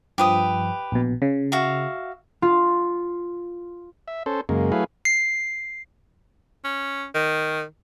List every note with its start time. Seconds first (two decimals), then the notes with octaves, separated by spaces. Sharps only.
0.18 G2 F3 G4 B4 D#6
0.92 A#1 B2
1.22 C#3
1.52 F#4 E5 F5
2.42 F4
4.08 E5
4.26 C#4 A4 C5
4.49 F#2 C#3 G#3 A#3
4.72 F#3 A3 E4 G#4 B4 F5
5.05 C7
6.64 C#4
7.15 D#3